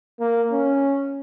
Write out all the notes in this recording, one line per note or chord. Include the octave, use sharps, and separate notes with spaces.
A#3
C#4